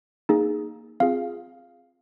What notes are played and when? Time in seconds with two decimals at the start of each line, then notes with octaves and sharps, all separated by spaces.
0.29 A#3 D#4 G#4
1.00 C4 F4 G#4 F5